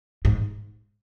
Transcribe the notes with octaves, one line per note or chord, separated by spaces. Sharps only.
G#2